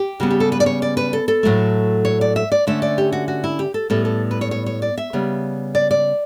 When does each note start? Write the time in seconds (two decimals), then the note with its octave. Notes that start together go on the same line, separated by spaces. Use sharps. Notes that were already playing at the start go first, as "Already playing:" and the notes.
Already playing: G4
0.20 C#3 G3 B3 F#4
0.30 G4
0.40 A4
0.52 B4
0.60 D5
0.66 C#5
0.82 D5
0.97 B4
1.13 A4
1.28 A4
1.43 A2 F#3 A3
2.05 C#5
2.21 D5
2.36 E5
2.52 D5
2.67 D3 A3 C#4 E5
2.82 D5
2.98 G4
3.12 F#4
3.28 F#4
3.44 E4
3.59 G4
3.74 A4
3.90 A2 G3 B3 A4
4.05 A4
4.31 B4
4.41 C#5
4.51 C#5
4.66 C#5
4.82 D5
4.98 E5
5.13 C#3 G3 B3
5.75 D5
5.91 D5